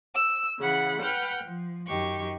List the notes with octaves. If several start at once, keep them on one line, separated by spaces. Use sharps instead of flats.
E6
C#3 E3 F#5 B5
B4 F#5 G5 F6
F3
F#2 D#3 G4 C#6